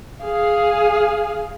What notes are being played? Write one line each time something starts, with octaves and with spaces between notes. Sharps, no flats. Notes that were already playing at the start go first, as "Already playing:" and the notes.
G#4 F5